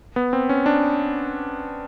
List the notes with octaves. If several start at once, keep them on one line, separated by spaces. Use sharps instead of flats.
B3
C4
C#4
D4